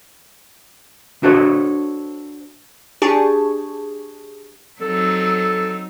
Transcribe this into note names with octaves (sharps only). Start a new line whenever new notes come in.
D4 F#4 A4 C5 C#5
D4 G4 G#4 A5 C#6
F#3 C4 D#4 A4